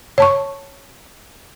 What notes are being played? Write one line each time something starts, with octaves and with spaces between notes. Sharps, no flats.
C#5 A5 C#6